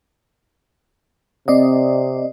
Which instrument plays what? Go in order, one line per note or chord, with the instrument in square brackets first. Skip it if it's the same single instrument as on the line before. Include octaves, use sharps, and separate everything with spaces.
[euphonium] C3 [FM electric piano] C4 D5 D#5